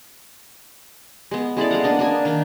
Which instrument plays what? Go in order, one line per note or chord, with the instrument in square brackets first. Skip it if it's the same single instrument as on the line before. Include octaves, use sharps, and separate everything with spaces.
[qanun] G#3 B3
G#3 E4 A4 D5
G#3 F5 F#5
A#3 B3 D4 D#5
A#3 D4 G#5
D#3 D4